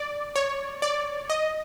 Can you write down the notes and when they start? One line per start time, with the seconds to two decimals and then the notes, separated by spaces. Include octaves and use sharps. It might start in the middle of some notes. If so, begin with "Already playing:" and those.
Already playing: D5
0.36 C#5
0.82 D5
1.30 D#5